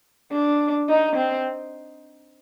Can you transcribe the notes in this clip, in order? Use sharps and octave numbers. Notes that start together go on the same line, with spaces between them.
D4
D#4
C4